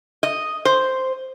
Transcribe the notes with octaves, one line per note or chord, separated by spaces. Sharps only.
D#5
C5